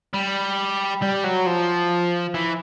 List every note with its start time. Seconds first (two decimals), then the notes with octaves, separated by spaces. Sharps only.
0.14 G3
1.02 G3
1.24 F#3
1.46 F3
2.34 E3